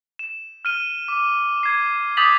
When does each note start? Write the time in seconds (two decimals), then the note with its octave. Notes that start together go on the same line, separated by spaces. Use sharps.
0.19 E7
0.65 F6 D#7 G7
1.08 D6
1.63 G#6 C7
2.17 D6 D#6 G6 A6 B6 F#7